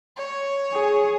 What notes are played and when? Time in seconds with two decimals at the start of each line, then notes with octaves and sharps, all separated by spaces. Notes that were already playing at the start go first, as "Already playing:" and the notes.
0.16 C#5
0.73 G#4